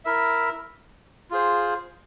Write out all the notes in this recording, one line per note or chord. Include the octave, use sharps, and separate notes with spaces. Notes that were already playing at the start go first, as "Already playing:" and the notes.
E4 A#4 E5
F4 G#4 C5